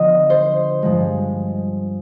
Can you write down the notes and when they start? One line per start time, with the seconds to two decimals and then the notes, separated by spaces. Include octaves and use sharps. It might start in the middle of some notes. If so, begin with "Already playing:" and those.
Already playing: D3 F3 B3 D#5
0.30 C5
0.83 G2 F3 G#3